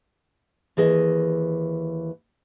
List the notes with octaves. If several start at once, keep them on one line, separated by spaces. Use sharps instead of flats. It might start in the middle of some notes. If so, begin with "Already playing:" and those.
D#2 E3 G#4 D#5